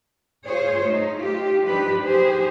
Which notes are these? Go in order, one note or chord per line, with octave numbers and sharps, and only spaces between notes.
F4 G#4 C5 C#5
A3 D#4
F4 G4
F3 D4 D#4 G4 B4
G4 G#4 C5